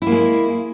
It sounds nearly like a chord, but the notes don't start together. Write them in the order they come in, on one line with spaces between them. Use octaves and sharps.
E4 A#3 G#3